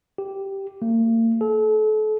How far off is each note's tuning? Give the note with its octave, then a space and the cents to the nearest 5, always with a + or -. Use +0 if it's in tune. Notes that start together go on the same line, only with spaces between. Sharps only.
G4 -5
A#3 -40
A4 -35